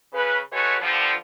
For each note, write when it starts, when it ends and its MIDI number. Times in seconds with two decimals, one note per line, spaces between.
0.13 0.38 49
0.13 0.38 71
0.52 0.75 56
0.52 0.75 57
0.52 0.75 66
0.52 0.75 71
0.52 0.75 73
0.81 1.13 43
0.81 1.13 50
0.81 1.13 53